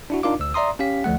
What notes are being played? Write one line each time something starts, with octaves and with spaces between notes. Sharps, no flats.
D4 E4 F#4
D4 D#4 F4 A#4 F5 D6
D2 E6
D5 E5 A#5 C6 D#6
C#4 G4 F5 B6
D2 F3 A3 F#5